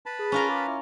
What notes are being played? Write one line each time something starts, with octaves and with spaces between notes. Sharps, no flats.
B4 A5 B5
G#4
C#4 F4 A#4
D6
E4